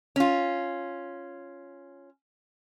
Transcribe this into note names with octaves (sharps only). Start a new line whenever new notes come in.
C#4 F4